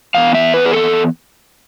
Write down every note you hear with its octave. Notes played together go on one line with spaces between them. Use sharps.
A2 E3 B3 F5
E5
B4
G#4
A4